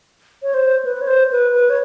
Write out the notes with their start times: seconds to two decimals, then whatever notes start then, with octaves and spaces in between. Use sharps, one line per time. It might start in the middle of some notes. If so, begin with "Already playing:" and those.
0.43 C#5
0.54 C5
0.85 B4
1.01 C#5
1.07 C5
1.31 B4
1.54 B4
1.70 C#5